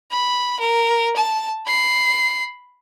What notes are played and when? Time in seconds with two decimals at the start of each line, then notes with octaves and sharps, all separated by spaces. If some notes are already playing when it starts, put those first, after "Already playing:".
0.11 B5
0.60 A#4
1.16 A5
1.67 B5 C7